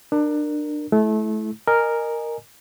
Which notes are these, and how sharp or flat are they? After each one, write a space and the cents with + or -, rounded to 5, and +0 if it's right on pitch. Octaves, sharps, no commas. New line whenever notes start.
D4 +25 A#4 +0
A3 -30 E4 +0
A#4 +0 D#5 -25 G#5 +0